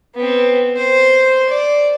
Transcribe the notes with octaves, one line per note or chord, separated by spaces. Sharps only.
B3 C4
C5
D5